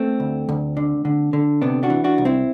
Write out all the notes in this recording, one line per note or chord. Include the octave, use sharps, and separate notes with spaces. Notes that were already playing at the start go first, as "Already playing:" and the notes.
Already playing: A3 C4
D2
D2
D3
D3
D3
C3 B3 D4
D4 F#4
E3
D4 F#4
C2
C4 E4